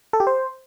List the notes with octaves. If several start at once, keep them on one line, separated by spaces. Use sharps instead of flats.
A4
G4
C5